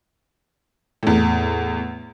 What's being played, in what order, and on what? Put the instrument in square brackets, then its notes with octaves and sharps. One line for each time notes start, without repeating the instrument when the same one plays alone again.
[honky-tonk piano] E2 A2